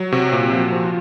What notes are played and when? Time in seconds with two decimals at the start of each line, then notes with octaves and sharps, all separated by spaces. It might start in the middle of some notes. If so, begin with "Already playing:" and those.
Already playing: F#3
0.12 C3 F#4
0.32 A#2
0.53 F3
0.59 F#4
0.72 F3 F#4
0.86 F4